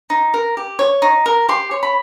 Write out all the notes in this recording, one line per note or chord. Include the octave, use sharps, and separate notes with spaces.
D#4
A#4
G4
C#5
D#4
A#4
G4 C6
C#5
B5